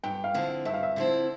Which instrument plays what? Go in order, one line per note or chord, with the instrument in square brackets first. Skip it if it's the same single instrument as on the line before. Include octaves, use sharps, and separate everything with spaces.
[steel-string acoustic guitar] G2 [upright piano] G5
[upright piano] F5
[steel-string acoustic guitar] D3 F3 C4 E4
[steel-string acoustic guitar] G2 [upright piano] E5
[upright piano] F5
E5
[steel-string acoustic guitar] D3 F3 C4 E4